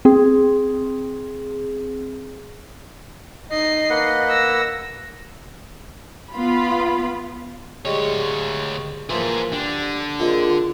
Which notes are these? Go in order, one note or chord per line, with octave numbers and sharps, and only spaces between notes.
C4 G#4
D#4 D#5 C7
A#3 B4 F#5
E6 A#6
B3 F4 B5
D2 G3 G#3 C#5
E3 F3 A#3 G#4 C5
D3 G3
G#3 A#3 C4 F4